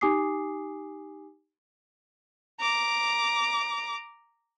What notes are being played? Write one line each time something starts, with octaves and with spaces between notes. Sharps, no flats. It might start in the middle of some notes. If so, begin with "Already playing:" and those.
D#4 G4 G#5 D6 D#6 C7
A#5 D6